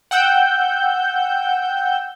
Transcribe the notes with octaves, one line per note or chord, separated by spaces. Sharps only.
F#5 G5 E6 G6